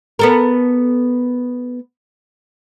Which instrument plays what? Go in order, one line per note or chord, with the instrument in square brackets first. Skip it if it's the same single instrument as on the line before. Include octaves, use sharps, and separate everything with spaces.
[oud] B3 A4 A#4